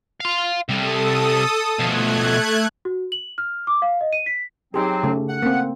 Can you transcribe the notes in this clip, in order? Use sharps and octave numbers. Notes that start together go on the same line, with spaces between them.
F5 C6
C3 G3 A4 D#6
B2 F3 A3 F#6 G#6
F#4
F#7
F6
D6
F5
D#5
D#7
B6
F#3 C4 D#4 G4 G#4
C#3 A3
F#5
A#3 C4